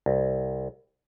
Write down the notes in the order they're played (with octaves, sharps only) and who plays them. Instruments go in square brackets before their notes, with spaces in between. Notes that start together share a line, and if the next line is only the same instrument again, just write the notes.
[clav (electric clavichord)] C2